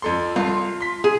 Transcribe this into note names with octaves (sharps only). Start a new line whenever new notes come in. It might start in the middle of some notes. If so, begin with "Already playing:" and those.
F2 A4 C6
C2 F4 A5
C6 B6
G#4